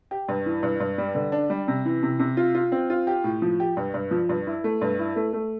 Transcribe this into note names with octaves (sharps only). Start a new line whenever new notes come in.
G4
G2
E3
G2
G2
G3
D3
D4
G3
C3
E3
C3
C3
F4
F4
C4
F4
G4
A2
F3
G4
G2
G2
F3
G2
E4
A3
G2
E4
A3
A3